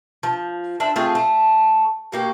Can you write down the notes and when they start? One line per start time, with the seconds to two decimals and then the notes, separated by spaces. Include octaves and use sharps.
0.23 F3
0.80 D4 C5 E5
0.96 A3 C4 F4 G#4
1.15 A3
2.12 B2 A#3 G4